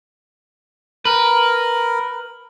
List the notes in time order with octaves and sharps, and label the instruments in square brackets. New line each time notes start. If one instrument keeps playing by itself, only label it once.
[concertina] A#4 [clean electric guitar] B4